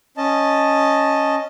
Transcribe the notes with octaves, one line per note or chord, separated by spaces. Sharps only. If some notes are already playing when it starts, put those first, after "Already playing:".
C#4 D#5 A5